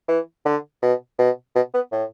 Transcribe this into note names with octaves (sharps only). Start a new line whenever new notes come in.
E3
D3
B2
B2
B2
B3
A2